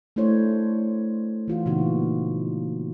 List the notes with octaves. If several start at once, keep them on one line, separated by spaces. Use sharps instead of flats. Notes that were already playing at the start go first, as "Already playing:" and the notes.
A3 D4 E4 C5 C#5
E3 F4 F#4
A#2 C#3 E3 B3 D#4 F#4